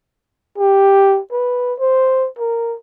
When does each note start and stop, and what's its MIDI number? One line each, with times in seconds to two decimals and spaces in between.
0.58 1.20 67
1.32 1.74 71
1.79 2.28 72
2.39 2.76 70